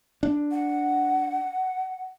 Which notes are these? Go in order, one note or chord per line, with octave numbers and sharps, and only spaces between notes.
D4
F#5